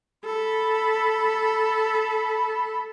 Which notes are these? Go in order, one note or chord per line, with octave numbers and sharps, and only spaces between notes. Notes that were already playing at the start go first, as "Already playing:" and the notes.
A4 B5